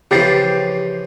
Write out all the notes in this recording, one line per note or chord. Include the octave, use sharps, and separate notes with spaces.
C#3 E3 F3 G4 A6 C7